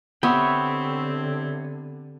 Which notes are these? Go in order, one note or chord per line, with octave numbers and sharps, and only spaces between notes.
D3 B3 C4 G4 C#5 E5 G5